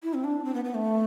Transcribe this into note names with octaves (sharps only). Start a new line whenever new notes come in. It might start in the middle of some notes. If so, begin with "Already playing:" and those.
E4
C4
D4
C4
B3
B3
A3